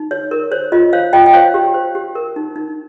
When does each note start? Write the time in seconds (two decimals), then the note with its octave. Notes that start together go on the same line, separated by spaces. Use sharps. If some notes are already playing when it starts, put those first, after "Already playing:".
Already playing: D#4
0.11 C#5
0.31 A#4
0.51 C5 C#5
0.72 F4 D#5
0.93 C5 C#5 F5
1.13 F4 D#5 G5
1.26 G5
1.33 C5 C#5 F5
1.54 G4
1.74 C5
1.95 G4
2.15 A#4
2.36 D#4
2.56 D#4